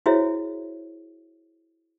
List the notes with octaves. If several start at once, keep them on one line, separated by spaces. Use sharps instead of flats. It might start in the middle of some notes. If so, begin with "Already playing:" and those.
E4 F#4 G#4 C5 C#5 E5